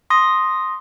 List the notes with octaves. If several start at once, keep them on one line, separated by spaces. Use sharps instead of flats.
C6 D#6 A#6